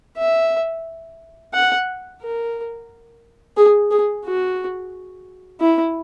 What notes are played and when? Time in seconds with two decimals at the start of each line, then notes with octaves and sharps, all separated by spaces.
0.17 E5
1.54 F#5
2.22 A#4
3.57 G#4
3.91 G#4
4.25 F#4
5.60 E4